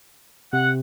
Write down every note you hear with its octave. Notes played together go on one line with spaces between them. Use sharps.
C3 F#5